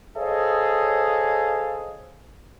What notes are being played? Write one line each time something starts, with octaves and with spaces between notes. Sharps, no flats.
G#4 A4 C5 C#5 D#5 F5